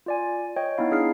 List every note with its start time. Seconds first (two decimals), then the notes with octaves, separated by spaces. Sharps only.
0.06 F4 D5 G#5
0.56 C#5 D#5 G5
0.78 B3 D#4 E4 F5
0.91 D4 G#4 F6 C7